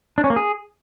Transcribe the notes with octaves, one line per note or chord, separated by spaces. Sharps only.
D4
C#4
A#3
G#4